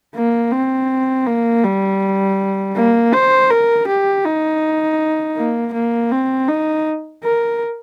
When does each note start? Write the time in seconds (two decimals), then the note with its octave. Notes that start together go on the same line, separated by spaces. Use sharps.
0.15 A#3
0.52 C4
1.27 A#3
1.64 G3
2.75 A#3
3.13 C5
3.50 A#4
3.87 G4
4.25 D#4
5.36 A#3
5.73 A#3
6.11 C4
6.48 D#4
7.23 A#4